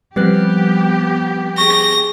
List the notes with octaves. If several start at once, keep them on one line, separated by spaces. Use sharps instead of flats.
F3 G3 B3 C4 G4 B4 F#6
G#4 C#6 A#6